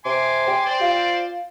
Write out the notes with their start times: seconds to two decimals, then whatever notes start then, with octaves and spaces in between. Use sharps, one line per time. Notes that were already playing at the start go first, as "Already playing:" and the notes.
0.05 C3 G#5 C6 D6
0.47 G4
0.66 C4 C5 D5
0.81 F4